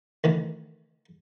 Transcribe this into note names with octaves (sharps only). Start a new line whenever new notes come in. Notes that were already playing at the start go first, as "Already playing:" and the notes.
D2 D#3 E3